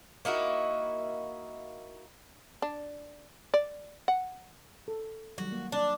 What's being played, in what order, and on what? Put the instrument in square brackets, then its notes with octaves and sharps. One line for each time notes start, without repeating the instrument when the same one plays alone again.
[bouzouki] A#3 D#4 E4 F#4
[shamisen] D4
D5
F#5
[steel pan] A4
[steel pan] D#3 F#3 G3 [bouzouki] F#4
[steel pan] A#3
[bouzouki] D4